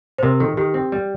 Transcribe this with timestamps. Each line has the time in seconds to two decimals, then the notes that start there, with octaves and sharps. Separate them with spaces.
0.18 C5
0.23 C3 A#4
0.40 D#3 A4
0.57 D#3 G4
0.74 C4
0.92 G3